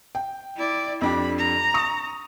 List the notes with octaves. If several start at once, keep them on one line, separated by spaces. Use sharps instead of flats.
G5
E4 D5
F2 D4 G4 B5
A#5
C#6 D#6